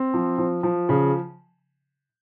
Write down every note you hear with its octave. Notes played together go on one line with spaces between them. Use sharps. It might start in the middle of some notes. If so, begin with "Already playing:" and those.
Already playing: C4
F3
F3
F3
C#3